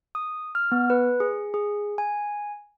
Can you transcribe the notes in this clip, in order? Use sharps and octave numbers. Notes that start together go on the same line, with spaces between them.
D#6
F6
B3
B4
G#4
G#4
G#5